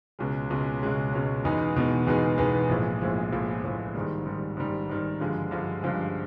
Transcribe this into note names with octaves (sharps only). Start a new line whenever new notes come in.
C#2 B2 G#3 C#4
C#2 B2 G#3 C#4
C#2 B2 G#3 C#4
C#2 B2 G#3 C#4
E2 B2 G#3 B3 D#4
E2 B2 G#3 B3 D#4
E2 B2 G#3 B3 D#4
E2 B2 G#3 B3 D#4
A#1 A2 F3 G#3
A#1 A2 F3 G#3
A#1 A2 F3 G#3
A#1 A2 F3 G#3
G#2 D#3 G3
G#2 D#3 G3
G#2 D#3 G3
G#2 D#3 G3
G2 D3 F3 G#3
G2 D3 F3 G#3
G2 D3 F3 G#3